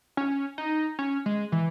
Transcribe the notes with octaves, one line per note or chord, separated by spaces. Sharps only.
C#4
D#4
C#4
G#3
E3